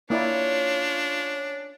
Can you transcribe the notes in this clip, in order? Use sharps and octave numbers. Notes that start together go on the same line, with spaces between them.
A#3 C#4 D4 E4 F4 C#5 D5